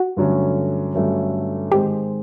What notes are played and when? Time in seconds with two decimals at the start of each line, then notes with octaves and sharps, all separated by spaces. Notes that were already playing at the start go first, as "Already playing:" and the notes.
Already playing: F#4
0.17 G2 D3 F#3 A3 C#4
0.94 G2 D3 F#3 A3 C#4
1.72 G#2 D#3 G#3 C4 G4